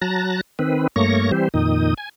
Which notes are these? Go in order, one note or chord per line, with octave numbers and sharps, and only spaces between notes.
F#3 A5 A#5 F#6 A6 A#6
D#3 C4 B4
G2 A3 A#3 C#5 C#6 A#6
E3 G3 C4 G4 C5
F2 A#2 D#3 D#4 D#6
G#5